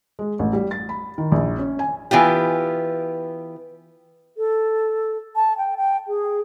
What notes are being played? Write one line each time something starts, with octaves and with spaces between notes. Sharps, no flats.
G#3
A1
G3
A6
B5
D#3
A#1
C#4
G#5
E3 B3 F4 G4
A4
A5
G5
G5
G#4